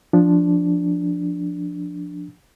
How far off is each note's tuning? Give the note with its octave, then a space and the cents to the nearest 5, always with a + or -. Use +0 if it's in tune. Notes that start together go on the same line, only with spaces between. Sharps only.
F3 +0 D4 +0